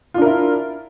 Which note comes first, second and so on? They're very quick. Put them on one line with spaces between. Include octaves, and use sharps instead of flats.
F4 D4 A#4 E4